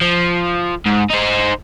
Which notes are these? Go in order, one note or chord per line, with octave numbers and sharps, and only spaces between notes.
F3
G#2
D#4 C5